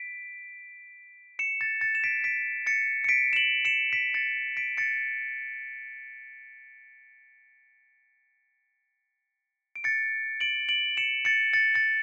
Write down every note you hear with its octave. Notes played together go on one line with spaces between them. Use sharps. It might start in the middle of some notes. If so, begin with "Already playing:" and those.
Already playing: B6 D7
C#7 E7
A6 C#7
A6 C#7
E7
B6 D7
B6 D7
A6 C#7
C#7
B6 D7
E7
D7 F#7
C#7 E7
B6 D7
A6 C#7
B6 D7
A6 C#7
D7
A6 C#7
D7 F#7
D7 F#7
C#7 E7
A6 C#7
A6 C#7
A6 C#7